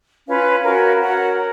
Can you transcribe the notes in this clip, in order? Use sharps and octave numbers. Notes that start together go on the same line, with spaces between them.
C#4 F4 B4 F5
C#4 F#4 A#4 F5
F#4 A#4 C#5 F#5
A#4